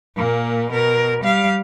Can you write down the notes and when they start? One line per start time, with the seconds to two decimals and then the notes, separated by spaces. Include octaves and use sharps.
0.16 A#2 A#3
0.71 B2 A#4
1.22 G3 F5